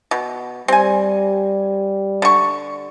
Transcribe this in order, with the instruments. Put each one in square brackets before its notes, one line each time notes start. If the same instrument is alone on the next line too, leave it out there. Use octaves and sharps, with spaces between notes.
[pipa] B2
[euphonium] G3 [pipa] C4 G#5
[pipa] D3 C#6